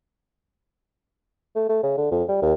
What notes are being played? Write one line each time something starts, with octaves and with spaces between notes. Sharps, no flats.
A3
A3
C#3
D3
F2
G3
D#2